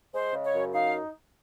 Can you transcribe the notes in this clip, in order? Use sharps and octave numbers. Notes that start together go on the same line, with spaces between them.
G#3 C5
C#3
C#5
F#2
D#4 F5